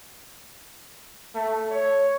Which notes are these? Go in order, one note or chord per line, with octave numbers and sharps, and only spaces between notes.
A3
C#5